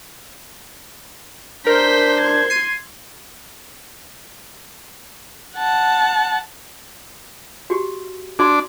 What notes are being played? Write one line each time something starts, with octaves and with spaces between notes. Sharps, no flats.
D4 A#4 C5 G6 B6
C6 G#6
C7 D#7
F#5 A5
F#4 G4
D4 F#4 D5 C6